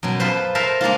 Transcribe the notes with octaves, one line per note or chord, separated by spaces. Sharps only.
F#2 B2
F4 A4 B4 C5
A4 A#4 C5 E5 F5
G#3 A#3 D4 F4